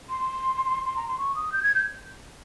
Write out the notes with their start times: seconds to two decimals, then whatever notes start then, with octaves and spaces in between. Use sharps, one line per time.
0.10 C6
0.85 C6
0.96 A#5
1.08 C6
1.18 C#6
1.35 D#6
1.52 G6
1.63 G#6
1.75 G6